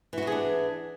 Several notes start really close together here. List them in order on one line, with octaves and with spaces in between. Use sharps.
E3 F#4 B3 G#4 D4